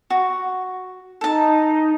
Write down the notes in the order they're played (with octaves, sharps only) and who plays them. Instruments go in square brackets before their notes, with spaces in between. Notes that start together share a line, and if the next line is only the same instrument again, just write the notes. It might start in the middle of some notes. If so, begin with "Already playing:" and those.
[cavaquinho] F#4
[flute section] D#4 [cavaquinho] A4 A5